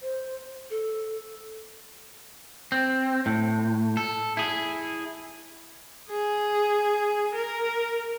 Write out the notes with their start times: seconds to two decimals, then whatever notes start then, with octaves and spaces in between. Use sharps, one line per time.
0.01 C5
0.70 A4
2.72 C4
3.26 A2
3.97 A4
4.37 E4 G#4
6.09 G#4
7.34 A#4